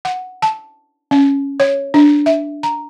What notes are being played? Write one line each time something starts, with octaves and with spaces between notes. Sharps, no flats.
F#5
A5
C#4
C#5
D4
E5
A#5